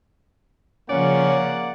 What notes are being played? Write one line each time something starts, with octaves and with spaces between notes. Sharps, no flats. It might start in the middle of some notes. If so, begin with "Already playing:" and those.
C#3 F3 A#3 C#4 D5 F#5